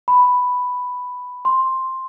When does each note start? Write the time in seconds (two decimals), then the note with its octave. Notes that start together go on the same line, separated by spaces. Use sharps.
0.08 B5
1.45 C6